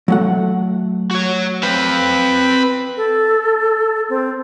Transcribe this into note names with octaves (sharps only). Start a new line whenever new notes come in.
F#3 A3 F#5
F#4 C#5
C4 B4 C5 F5
A4
C4